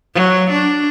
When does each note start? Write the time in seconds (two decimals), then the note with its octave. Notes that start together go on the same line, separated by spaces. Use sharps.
0.15 F#3
0.51 D4